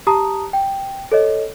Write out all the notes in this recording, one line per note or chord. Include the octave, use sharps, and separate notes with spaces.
G4 A5 A#5 D#6
G5
A4 C#5 D#5